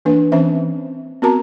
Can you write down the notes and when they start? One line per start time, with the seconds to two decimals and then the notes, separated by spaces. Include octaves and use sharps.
0.05 E3 A#3 D4 B4
0.32 E3 C4 C#4 C5 E5
1.22 B3 C4 F#4 A#4 A5 A#5